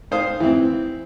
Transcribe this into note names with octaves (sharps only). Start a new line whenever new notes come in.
G#2 C5 F5 D#6
E3 C4